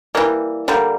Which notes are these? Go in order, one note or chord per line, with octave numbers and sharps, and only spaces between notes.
E3 G3 A#3
D3 G3 A#3